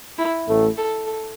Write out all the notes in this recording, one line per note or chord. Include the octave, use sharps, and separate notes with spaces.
E4
A1 A2 A3
A4
A4